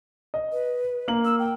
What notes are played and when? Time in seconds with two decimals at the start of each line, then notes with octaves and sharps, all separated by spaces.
0.34 D#5
0.52 B4
1.08 A#3 F#7
1.25 E6
1.39 G5